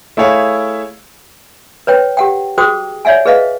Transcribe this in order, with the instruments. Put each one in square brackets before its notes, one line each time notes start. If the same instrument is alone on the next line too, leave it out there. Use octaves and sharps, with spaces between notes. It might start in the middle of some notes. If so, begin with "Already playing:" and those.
[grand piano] A3 E4 G#4 C#5 F5
[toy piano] B4 C#5 G5
G4 F#5 G5
F#4 G#4 C5 G5 D6 D#6
C#5 D5 E5 F#5 G#5
G#4 B4 D#5 F5